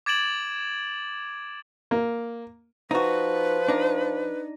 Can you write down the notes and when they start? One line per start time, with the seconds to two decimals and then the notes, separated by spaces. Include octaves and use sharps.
0.06 D6 G#6 A6 D7 E7 F#7
1.91 A#3
2.91 F3 D#4 F#4 B4
3.68 D4 D#4